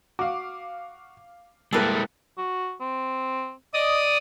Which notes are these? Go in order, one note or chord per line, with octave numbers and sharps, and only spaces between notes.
F#4 F5 D6
G3 G#3 A#3 E4 A4 B4
F#4
C4
D5 D#5 D#6